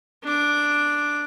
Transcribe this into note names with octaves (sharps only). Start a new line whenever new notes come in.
D4 D6